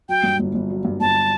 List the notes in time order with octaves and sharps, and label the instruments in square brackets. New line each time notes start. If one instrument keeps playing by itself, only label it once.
[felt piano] F#3 [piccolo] G5
[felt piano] G2
G1
G1
F#3
G2
[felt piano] G1 [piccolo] A5